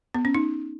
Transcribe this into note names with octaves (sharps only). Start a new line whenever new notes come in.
B3
C#4
D#4